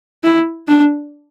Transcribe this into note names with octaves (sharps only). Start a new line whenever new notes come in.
E4
D4